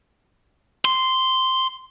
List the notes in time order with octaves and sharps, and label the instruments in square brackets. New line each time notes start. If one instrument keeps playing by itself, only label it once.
[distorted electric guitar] C6